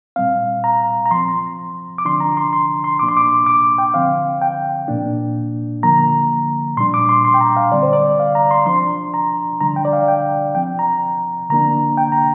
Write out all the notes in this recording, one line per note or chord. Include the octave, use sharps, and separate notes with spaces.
A#2 G3 C4 F5
A#5
A#5
F3 C4 C6
D6
D3 F3 D4 C6
A#5
C6
C6
C6
A#2 A#3 D4 D6
C6
D6
D6
G5
D3 F3 C4 F5
G5
A#2 A#3 D4
D3 F3 A#3 A#5
A#2 G3 D4 C6
D6
C6
C6
G5
A#5
F5
D3 G3 C4 D5
C5
D5
F5
A#5
C6
F3 D4 C6
A#5
D3 G3 D4 A#5
G5
D5
F5
G5
F3 C4 G5
A#5
D3 A#3 D4 A#5
G5
A#5